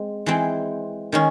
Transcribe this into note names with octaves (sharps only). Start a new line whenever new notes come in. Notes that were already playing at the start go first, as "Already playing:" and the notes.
Already playing: G#3 C4
E3 G#3 C4
D#3 G#3 C#4